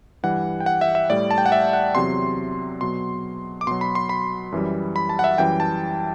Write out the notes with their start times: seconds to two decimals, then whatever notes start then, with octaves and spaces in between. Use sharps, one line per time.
0.23 G2 E3 G3 F#5
0.60 G5
0.66 F#5
0.81 E5
0.95 E5
1.10 A2 G3 D5
1.31 A5
1.38 G5
1.46 F#5
1.52 E5
1.73 F#5
1.95 E2 C3 F#3 C6
2.81 B2 F#3 C6
3.61 D6
3.67 B2 F#3 C6
3.81 B5
3.95 C6
4.09 B5
4.52 F#2 E3 G3
4.96 B5
5.09 A5
5.19 F#5
5.24 E5
5.38 F#2 E3 G3 G5
5.60 A5